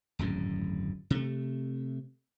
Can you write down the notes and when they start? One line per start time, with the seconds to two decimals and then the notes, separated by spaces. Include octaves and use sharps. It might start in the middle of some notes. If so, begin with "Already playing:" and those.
0.19 D1 G#1 F#2 A2
1.10 C3 A3